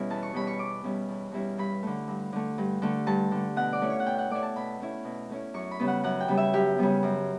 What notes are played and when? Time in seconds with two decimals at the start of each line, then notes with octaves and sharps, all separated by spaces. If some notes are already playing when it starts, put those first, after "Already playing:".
Already playing: B2 G3 C#4 E4
0.10 E2 A5
0.23 C#6
0.34 B2 G3 C#4 E4 B5
0.47 C#6
0.59 E2 D6
0.84 B2 G3 C#4 E4
1.09 E2
1.32 B2 G3 C#4 E4
1.58 G2 B5
1.83 D3 A3
2.08 G2
2.32 D3 A3
2.58 G2
2.82 D3 A3
3.07 G2 A5
3.31 D3 A3
3.56 B2 F#5
3.73 D5
3.82 A3 C#4 E4
3.90 C#5
4.00 F#5
4.06 B2 G5
4.19 F#5
4.30 A3 C#4 E4 D5
4.43 A5
4.56 B2 B5
4.81 A3 C#4 E4
5.05 B2
5.30 A3 C#4 E4
5.54 F#2 C#6
5.71 B5
5.80 C#3 G3 B3
5.88 F#5
6.03 F#2 F#5
6.21 G5
6.28 C#3 G3 B3
6.37 E5
6.53 F#2 G4
6.78 C#3 G3 B3
7.03 F#2